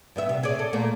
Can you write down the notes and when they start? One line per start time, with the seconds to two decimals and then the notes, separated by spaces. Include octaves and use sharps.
0.16 G2 B3 E5
0.29 C3
0.43 G#4 C#5 D5
0.59 A4
0.73 A#2 A3 A#3